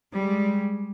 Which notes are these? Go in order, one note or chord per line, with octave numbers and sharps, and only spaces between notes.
G3 G#3